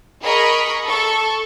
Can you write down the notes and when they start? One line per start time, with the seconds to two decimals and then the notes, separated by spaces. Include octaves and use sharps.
0.23 G#4 A#4 D#5 B5 C#6
0.85 A4 C#6